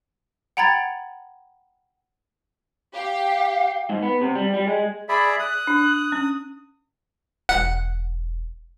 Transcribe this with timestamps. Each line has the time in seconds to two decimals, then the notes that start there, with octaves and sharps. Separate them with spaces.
0.57 F#5 G5 A#5 B5 G#6 A6
2.95 G4 F5
3.90 G#2
4.03 B3
4.21 C3
4.35 G3
4.54 G3
4.67 G#3
5.09 G#4 D5 E5 B5
5.39 D#6 F#6
5.67 D4
6.12 C#4
7.49 E1 F#5